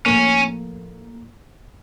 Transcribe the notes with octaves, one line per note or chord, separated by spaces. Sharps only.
A2 F3 A#3 C#4